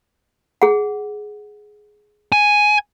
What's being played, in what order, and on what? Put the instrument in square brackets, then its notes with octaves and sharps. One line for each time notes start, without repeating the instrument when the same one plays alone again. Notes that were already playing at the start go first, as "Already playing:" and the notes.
[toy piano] G#4 F#5
[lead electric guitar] G#5